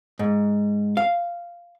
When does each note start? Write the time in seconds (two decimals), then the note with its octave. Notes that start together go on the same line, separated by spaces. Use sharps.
0.19 G#2
0.97 F5